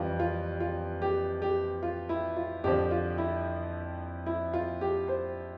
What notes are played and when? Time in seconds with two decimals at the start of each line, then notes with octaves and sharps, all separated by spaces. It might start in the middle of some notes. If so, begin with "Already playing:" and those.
Already playing: F2 E3 G3 F4
0.20 F4
0.60 F4
1.02 G4
1.42 G4
1.83 F4
2.09 E4
2.36 F4
2.64 F2 D3 F3 G4
2.91 F4
3.18 E4
4.26 E4
4.54 F4
4.81 G4
5.08 C5